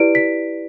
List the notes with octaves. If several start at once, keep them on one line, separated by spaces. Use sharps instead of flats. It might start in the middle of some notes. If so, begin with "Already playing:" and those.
Already playing: E4 G4 B4 D5 D7
B6